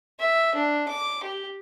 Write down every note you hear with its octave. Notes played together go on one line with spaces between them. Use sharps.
E5
D4
D6
G4